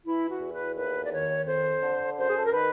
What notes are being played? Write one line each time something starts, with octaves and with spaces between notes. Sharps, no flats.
E3 E4
F#4
E2
B4
D#2 B4
D5
D#3 C#5
F2 C5
D3
F#2 C5
G#4
A4
A#4
D#3 B4